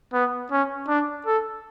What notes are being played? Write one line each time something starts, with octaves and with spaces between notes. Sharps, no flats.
B3
C#4
D4
A4